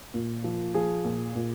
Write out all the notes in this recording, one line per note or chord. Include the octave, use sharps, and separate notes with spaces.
A#2
F3
F3 G#4
A#2
A#2